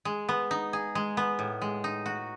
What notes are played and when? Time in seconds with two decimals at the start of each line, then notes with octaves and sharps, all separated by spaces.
0.05 G#3
0.29 B3
0.51 D#4
0.73 G#4
0.95 G#3
1.17 B3
1.39 A2
1.62 G#3
1.84 D#4
2.06 F#4